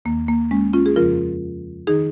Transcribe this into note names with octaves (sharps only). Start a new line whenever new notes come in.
D#2 D#3 A#3
A#3
G#3 C#4
C#4 F4
G#4
F2 C#3 F3 F4 A#4
D#3 D#4 G#4